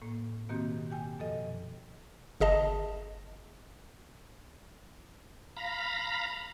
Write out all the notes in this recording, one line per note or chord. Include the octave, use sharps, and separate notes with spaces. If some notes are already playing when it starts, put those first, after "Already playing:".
A2 A#3
B2 D#3 A#3 C4 F#4 G4
G4 G5 G#5
F#2 B2 F3 A4 D#5
G1 G#4 D#5 A5
F5 A#5 B5